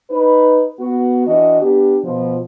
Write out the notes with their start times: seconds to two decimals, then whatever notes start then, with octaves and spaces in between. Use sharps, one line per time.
0.10 D#4 B4
0.79 B3 F#4
1.27 E3 D4 F#4 D#5
1.61 B3 D4 G4
2.04 B2 F3